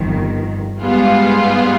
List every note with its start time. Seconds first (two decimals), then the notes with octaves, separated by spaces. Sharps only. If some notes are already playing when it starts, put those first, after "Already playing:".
Already playing: G1 F2 D#3
0.81 G#2 G3 B3 F4 G#4